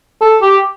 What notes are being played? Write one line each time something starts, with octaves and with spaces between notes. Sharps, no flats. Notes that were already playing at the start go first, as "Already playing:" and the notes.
A4
G4